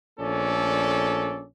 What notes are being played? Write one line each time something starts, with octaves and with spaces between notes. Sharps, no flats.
A#1 A3 C#4 A4 D5